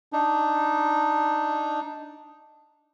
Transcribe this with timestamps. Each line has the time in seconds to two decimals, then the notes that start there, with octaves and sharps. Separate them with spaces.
0.13 D4 D#4